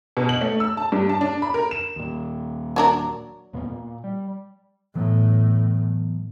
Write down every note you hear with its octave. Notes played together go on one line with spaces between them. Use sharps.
B2
F#7
A3
E6
A5
G2
A5
D4
B5
A#4
E7
D#2 A#2
F#3 D4 A#4
D#2 A#2 B3
A#2
G3
A2 E3 F#3 B3